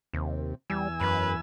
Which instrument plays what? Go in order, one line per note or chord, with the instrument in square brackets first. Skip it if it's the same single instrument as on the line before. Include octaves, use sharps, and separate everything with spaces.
[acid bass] D#2 [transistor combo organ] C3
[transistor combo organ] E2 G#5 E6 [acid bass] G3
[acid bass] F#2 [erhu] B4